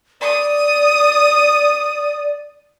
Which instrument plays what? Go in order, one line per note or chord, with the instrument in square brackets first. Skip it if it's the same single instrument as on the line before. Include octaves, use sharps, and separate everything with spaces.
[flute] D5 [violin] D#6